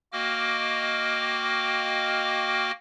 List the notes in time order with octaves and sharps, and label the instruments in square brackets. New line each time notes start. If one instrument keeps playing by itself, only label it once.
[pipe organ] A#3 F#4 D#5 G5 D6 F6